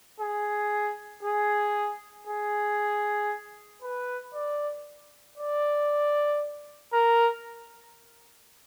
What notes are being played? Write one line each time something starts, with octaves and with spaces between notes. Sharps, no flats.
G#4
G#4
G#4
B4
D5
D5
A#4